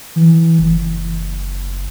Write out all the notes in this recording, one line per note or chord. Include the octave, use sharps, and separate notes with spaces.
E3
F#1